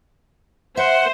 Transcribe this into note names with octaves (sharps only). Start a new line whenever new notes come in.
C5 E5 F#5